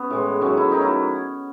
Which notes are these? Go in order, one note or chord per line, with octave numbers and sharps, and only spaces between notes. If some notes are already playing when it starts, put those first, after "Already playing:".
Already playing: B3 C#4
A2 E3 G#3
D#3 F#3 A3 C#4
E4
D#3 F#3 A3 D#4
E4